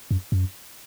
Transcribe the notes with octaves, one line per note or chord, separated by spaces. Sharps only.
F#2
F#2